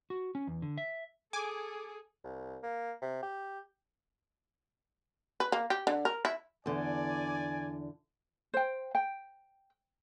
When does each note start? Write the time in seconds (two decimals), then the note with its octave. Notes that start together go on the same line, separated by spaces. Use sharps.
0.10 F#4
0.35 C#4
0.47 E2
0.62 D3
0.78 E5
1.33 G#4 A4 G#5 D6
2.24 C2
2.63 A#3
3.02 C3
3.23 G4
5.40 B4
5.52 A#3
5.70 G4
5.87 D3
6.05 A#4
6.25 E4
6.66 E2 D3 D5 G#5
8.54 C5 G5
8.95 G5